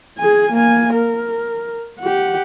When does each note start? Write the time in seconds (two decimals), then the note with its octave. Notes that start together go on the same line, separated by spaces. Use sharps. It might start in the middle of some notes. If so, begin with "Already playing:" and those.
0.18 G#4 G#5
0.52 A#3 G#5
0.94 A#4
2.00 G4 F#5